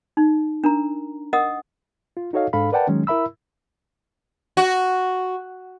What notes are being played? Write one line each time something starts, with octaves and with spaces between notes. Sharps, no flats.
D#4
D4 A#4 A#5
A#4 D#5 F#5 D#6 E6
F4
D#4 F#4 A4 C#5 D#5 F5
G#2 D4 A4 F5 B5
A#4 B4 D5 F#5 G5 A5
D#3 F#3 G#3 C#4
E4 A#4 E5 B5 E6
F#4